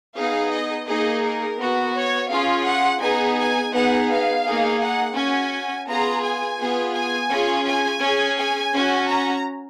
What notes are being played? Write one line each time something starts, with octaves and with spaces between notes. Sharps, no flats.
B3 D#4 G#4 F5
D#5
A#3 D#4 G#4 D#5
A#4
B3 F#4
C#5
C#4 F4 G#4 F5
F#5
B3 D#4 G#4 G#5
G#5
B3 D#4 G#4 F#5
F5
A#3 D#4 G#4
F#5
C#4 F#4 G#5
B3 F4 G#4 A#5
G#5
B3 F4 G#4
G#5
C#4 F4 G#4
G#5
C#4 G#4
G#5
C#4 F#4
A#5